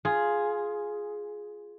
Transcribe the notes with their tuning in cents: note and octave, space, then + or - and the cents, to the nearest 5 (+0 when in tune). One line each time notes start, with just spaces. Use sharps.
F4 +0 G#4 +5